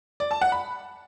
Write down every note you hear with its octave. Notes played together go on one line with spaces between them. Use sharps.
D5
A5
F#5
B5